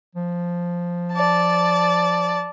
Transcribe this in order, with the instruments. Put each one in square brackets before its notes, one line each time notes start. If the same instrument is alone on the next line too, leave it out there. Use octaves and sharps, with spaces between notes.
[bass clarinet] F3
[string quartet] D5 A5